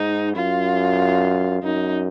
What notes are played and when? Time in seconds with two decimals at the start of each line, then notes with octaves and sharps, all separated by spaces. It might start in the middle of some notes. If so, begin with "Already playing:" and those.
Already playing: G#2 D#4
0.35 F#2 F4
1.63 F#2 D#4